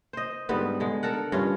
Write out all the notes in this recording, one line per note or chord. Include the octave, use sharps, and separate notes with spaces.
C5 D#5
G#2 D3 G3 B3
D3 G#3
A4 A#4 F#5
G2 C#4 F4